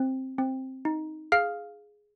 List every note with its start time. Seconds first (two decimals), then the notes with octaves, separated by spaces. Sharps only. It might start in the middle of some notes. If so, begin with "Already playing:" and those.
Already playing: C4
0.38 C4
0.85 D#4
1.32 G#4 F5 F6